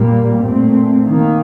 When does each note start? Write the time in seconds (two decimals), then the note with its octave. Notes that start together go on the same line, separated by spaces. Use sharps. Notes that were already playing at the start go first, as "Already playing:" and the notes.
Already playing: A#2 G3 A#3
0.44 A#2 A3 C4
1.05 D#3 A#3